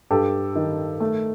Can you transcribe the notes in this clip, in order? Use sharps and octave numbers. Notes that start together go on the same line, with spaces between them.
G2 G4 A4
D#3
A3